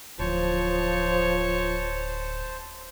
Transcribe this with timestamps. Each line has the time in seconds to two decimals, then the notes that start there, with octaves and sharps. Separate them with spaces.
0.19 D1 F3 C5 C#5 A5